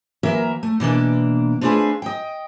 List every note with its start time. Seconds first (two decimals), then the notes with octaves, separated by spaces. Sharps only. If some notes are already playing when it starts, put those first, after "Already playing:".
0.23 E3 F#3 A#3 A#4 E5
0.63 A3
0.80 B2 E3 A#3 D4
1.61 A3 C4 D4 F4 G#4 B4
2.02 D#5 G5